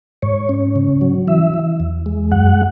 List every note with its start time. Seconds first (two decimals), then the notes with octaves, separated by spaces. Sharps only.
0.22 G#2 C#5
0.49 C#4
0.76 C#3
1.01 F#3
1.28 E3 E5
1.54 E3
1.80 E2
2.06 G#3
2.32 F#2 F#5